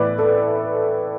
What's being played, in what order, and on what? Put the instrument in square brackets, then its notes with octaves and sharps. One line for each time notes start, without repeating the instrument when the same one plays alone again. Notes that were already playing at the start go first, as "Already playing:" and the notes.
Already playing: [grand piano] A2 E3 B3 E4 [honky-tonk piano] B4 D5
[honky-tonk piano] A4